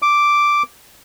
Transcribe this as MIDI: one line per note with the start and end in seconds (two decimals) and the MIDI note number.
0.02 0.63 86